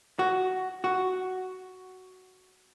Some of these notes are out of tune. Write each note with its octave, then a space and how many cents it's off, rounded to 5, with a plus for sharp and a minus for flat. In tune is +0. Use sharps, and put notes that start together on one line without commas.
F#4 +10
F#4 +5